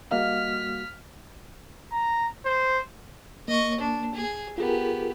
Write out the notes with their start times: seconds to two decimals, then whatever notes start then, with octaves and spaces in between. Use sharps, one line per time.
0.11 G3 A#3 F#4 D#5 F5 F6 B6
1.92 A#5
2.45 C5
3.48 A#3 D#5 C#6
3.80 D4
4.14 G#4
4.58 B3 F4 G4 G#4 A#4